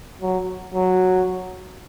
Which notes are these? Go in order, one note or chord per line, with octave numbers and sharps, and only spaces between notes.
F#3
F#3